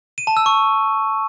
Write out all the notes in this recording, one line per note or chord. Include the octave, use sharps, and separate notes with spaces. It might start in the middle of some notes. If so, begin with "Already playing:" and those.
D#7
A5
E6
C#6